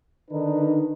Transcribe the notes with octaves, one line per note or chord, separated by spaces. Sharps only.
D3 D#3 D4 D#4 B4